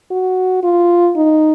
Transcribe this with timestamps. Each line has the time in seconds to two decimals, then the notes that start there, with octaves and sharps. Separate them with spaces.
0.11 F#4
0.63 F4
1.16 D#4